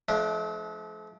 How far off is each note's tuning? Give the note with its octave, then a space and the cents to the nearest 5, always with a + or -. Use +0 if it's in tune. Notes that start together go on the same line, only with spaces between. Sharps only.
F3 -20 A3 -45 D4 +0